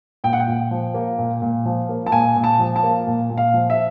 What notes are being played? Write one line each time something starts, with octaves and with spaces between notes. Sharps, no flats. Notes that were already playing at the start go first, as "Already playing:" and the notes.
A#2 G5
F#5
G5
A#2
F3
A#3
A#2
A#2
F3
A#3
A5
A#2 G#5
A#2
A5
F3
A5
A#3
A#2
A#2
F5
F3
E5